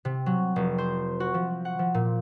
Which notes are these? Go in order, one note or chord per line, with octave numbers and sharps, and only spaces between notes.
C3
F#3
F1
C5
F#4
F3
F#5
F3
A#2